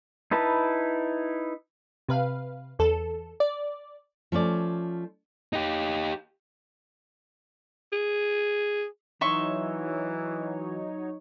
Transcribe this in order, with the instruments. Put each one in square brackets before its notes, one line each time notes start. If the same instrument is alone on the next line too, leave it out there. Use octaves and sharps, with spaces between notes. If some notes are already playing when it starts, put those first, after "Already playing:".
[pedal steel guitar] D#4 E4 B4 A5
[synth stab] C3 B4 F5
E2 A4
D5
[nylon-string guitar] F3 A3 C#4 D5
[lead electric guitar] D#4 G4
[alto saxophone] G#4
[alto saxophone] E3 [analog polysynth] F#3 D#4 C#5 [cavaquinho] E5 C6 C#6